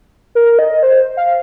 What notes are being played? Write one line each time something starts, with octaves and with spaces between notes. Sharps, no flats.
A#4
D#5
C5
F5